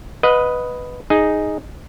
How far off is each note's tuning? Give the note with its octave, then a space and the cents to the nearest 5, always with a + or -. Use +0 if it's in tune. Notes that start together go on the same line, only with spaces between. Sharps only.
B4 +0 D#5 +0 F#5 -40
D#4 +0 G#4 +0